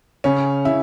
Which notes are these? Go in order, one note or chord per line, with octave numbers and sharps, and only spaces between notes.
C#3 C#4
C#3 E4